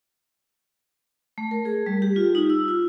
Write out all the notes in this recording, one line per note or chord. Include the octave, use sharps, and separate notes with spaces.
A3
A#4
G#4
G3
G4
F4
D#4
E6
F4